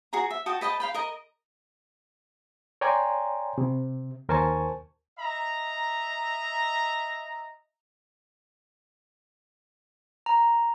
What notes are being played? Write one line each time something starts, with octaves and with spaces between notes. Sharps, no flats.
F#4 G#4 G#5 A#5
E5
F#4 G5 A5 D#6
B4 D#5 G5 A5
F5 G5 B5
A#4 D#5 A#5
C#5 D5 G5 G#5 A#5 C6
C3
D#2 A#4 C5 G#5 A5 C#6
D#5 E5 A#5
A#5